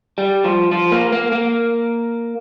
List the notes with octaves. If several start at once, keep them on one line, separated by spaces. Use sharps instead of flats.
G3
F3
F3
A#3
A#3
A#3